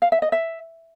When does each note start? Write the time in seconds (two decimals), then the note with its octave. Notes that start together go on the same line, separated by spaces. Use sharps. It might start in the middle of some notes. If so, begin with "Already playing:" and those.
0.02 F5
0.12 E5
0.22 D#5
0.32 E5